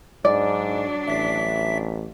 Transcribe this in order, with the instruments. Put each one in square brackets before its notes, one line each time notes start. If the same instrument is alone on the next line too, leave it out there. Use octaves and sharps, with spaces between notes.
[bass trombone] G#2 [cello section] F#3 D4 [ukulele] D5
[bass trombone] A1 [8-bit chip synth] E5 B6